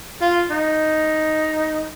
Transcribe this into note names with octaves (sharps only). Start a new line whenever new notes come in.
F4
D#4